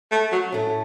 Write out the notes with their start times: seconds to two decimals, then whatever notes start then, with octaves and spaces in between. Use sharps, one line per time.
0.11 A3
0.32 F#3
0.52 A2 A3 C#4